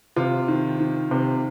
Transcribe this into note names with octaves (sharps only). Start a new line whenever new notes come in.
C3 F4
D#3
D#3
C3